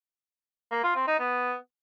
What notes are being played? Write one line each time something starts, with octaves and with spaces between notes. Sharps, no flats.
A#3
F4
C4
D#4
B3